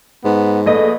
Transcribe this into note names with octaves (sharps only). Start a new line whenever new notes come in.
G#2 B3
A#1 A3 G#4 A4 B4 D#5